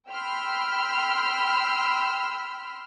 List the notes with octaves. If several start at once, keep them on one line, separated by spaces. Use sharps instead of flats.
G5 B5 C6 E6 F6